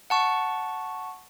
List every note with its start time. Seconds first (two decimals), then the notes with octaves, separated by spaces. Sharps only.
0.10 F#5 A5 C#6